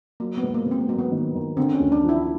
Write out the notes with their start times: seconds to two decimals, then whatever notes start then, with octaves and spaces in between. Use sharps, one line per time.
0.20 F#3 A#3
0.38 B3
0.43 G#2
0.54 A#3
0.66 G#2
0.71 C4
0.81 B3
0.88 F#3 A#3
0.99 B3
1.12 D#3
1.35 D#3
1.57 D3 C4
1.74 C#4
1.80 D2
1.92 D4
2.03 F3
2.09 E4